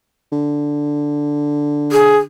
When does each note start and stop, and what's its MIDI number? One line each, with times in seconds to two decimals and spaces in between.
0.32 2.25 50
1.92 2.17 68